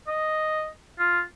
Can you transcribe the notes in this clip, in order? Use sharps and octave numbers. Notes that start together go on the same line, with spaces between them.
D#5
F4